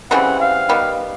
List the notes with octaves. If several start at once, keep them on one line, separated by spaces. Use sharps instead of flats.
C#3 E3 G3 C4 F#5
F5
D#3 G3 B3